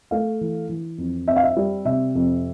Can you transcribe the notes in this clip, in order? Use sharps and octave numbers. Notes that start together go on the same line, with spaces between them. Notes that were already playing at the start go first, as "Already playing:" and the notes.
A3 F5
E3
E3
F2
C4 E5
F5
E5
G3
C3 E5
F2